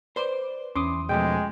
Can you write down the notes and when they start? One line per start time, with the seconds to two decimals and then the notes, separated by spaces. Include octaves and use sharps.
0.16 B4 C5 D5 C6 D6
0.76 E2 E3 C#4 C6 D6 D#6
1.09 B2 F3 G#3 A3 G5